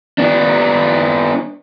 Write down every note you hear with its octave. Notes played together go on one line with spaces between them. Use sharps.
B3 D4